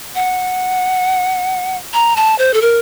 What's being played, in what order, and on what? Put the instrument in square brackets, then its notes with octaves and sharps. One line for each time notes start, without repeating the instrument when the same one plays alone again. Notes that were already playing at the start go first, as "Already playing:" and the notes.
[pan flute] F#5
A#5
A5
C5
A4
A#4